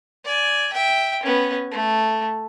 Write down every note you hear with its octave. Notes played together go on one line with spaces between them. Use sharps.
D5 G#5
E5 G5
B3 C#4
A3